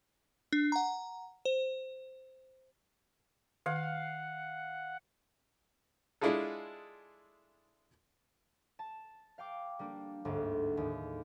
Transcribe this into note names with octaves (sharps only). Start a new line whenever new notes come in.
D4
F#5 A#5
C5
D#3 F5 F#5
G#3 D4 E4 F4 G#4 A4
A5
F5 G5 D6
G3 A#3 D4
G1 D2 G#2 A6
D#2 A2